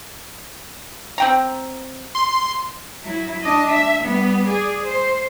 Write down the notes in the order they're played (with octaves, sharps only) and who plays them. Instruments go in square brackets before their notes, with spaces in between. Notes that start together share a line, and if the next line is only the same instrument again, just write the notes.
[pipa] C4 G5 A#5
[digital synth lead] C6
[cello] F#3 E4
D4 D#5
E5
G3 B3
G#4 D5
C5